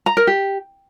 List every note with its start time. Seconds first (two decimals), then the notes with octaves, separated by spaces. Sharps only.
0.06 A#5
0.17 A#4
0.27 G4